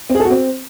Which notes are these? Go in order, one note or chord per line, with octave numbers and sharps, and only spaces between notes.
C4
G#4
A4
F#4
C4